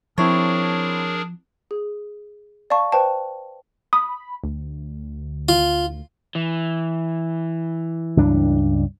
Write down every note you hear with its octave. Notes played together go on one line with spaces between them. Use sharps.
F3 C4 D4 E4 G#4 A#4 C#5 A5
G#4
D5 F5 A5 C#6
B4 C5 G5 A5
B5 D#6
D2
F4
E3
C#2 G2 D4